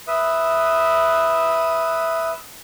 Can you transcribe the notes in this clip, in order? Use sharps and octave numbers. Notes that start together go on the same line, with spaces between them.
B4 E5 D#6